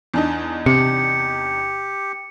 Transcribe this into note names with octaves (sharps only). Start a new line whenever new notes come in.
E2 D4 D#4
C3 G4 C#7